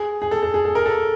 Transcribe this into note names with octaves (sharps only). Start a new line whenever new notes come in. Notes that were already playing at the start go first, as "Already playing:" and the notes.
Already playing: G#4
G#4
A4
A4
G#4
A4
A#4
A4